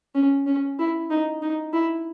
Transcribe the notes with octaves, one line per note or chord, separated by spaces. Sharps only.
C#4
C#4
E4
D#4
D#4
E4